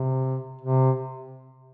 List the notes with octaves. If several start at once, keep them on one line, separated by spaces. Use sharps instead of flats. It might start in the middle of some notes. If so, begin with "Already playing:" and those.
Already playing: C3
C3